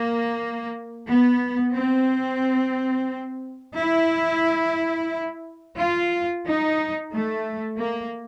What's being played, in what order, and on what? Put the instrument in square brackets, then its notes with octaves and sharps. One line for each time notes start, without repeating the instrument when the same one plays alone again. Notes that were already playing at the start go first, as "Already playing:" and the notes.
Already playing: [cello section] A#3
B3
C4
E4
F4
D#4
A3
A#3